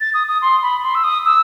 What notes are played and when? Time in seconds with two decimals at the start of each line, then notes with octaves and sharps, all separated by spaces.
0.01 A6
0.14 D#6
0.28 D#6
0.42 C6
0.62 B5
0.84 C6
0.95 E6
1.04 D#6
1.25 E6